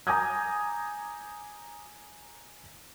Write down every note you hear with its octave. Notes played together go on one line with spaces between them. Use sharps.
G#5 A#5 D6 D#6 G6 G#6